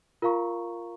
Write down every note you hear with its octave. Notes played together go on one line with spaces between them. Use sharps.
F4 A#4 F5 A#5 C#6